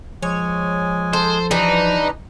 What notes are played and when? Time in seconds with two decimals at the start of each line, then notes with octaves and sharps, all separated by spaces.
0.23 F3 G#3 C#5 G#5
1.13 A4 C5
1.51 E3 G3 D4 D#4 B4 A#5